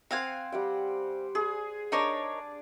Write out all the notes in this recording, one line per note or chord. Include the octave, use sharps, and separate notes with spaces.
C4 C5 F5 F#5 G#5
G3 F#5 G5
G#4
D4 D#4 A#4 C#5 D5